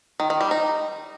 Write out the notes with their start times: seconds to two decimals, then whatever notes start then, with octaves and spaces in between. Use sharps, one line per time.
0.20 D#3
0.30 D#3
0.41 G3
0.51 D#4